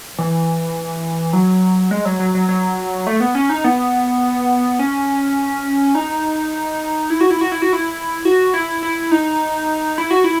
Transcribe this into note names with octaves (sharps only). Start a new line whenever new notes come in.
E3
F#3
G#3
F#3
F#3
F#3
F#3
A3
B3
C#4
D#4
B3
C#4
D#4
E4
F#4
E4
F#4
E4
F#4
E4
F#4
E4
E4
D#4
E4
F#4
E4